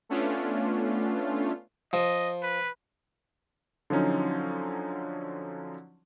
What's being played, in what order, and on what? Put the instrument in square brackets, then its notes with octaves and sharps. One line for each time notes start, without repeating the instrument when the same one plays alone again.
[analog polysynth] A3 B3 C#4 D4 F4
[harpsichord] F3 [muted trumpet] D#5
[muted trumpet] B4
[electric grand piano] D3 F3 F#3 C#4 D#4